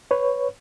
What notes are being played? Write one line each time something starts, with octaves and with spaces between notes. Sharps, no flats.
B4 C#5